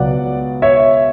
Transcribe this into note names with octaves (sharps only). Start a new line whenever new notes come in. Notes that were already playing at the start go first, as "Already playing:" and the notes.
Already playing: C#2 B2 F#3 B3 D5 F#5
C#5 E5